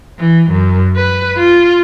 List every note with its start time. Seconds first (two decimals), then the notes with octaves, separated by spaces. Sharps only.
0.19 E3
0.51 F#2
0.97 B4
1.38 F4